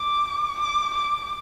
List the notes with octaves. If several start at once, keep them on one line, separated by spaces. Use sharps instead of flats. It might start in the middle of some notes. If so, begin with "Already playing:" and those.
Already playing: D6
D6
D6